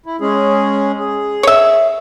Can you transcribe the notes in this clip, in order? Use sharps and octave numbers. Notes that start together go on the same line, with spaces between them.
E4
G#3 C#4 G#4
G#4
C#5 E5